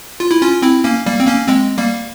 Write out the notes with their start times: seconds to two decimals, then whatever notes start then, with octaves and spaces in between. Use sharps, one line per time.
0.20 F4
0.31 E4
0.42 C#4 F4
0.62 C4 E4
0.84 A#3 C#4
1.06 G3 A#3
1.20 C4
1.27 A#3 C#4
1.48 G#3 C4
1.78 G3 A#3